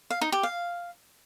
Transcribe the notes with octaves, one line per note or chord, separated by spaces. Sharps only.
F5
D#4
G4
F5